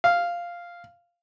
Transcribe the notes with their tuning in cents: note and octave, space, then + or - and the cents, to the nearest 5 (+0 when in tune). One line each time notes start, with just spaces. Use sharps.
F5 -5